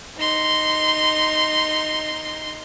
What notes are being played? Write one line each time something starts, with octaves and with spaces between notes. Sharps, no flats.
D#4 C6